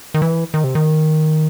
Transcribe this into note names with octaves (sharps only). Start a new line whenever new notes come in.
D#3
E3
D#3
C3
D#3